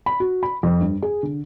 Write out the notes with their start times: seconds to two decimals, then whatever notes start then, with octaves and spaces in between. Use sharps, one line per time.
0.06 B5
0.20 F#4
0.43 B5
0.63 F2
0.80 G2
1.02 G#4
1.23 D3